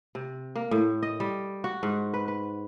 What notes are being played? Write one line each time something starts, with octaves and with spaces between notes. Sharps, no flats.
C3
A#3
A2
D#5
G3
F#4
G#2
B4
B4